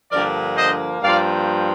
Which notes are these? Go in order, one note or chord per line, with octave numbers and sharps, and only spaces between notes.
G2 D3 F3 A#3 A#4 D5
C5 D#5
G2 F3 A#3 D5 F5